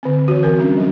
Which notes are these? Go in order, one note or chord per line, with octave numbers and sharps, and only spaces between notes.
D3 C4
E3 F#4
C4 A#4
G3 C#4 D4
F#3 F#4